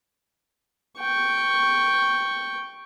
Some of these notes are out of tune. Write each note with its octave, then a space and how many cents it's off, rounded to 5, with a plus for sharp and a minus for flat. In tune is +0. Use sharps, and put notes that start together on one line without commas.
G5 +0 C#6 +0